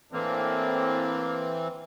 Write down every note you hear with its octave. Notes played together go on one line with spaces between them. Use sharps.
A2 E3 A#3 C4 D4